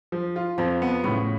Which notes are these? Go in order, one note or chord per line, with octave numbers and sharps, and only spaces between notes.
F3
F4
F2 F3
B3
A2 C#3